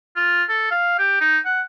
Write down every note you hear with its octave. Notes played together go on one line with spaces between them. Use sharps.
F4
A4
F5
G4
D#4
F#5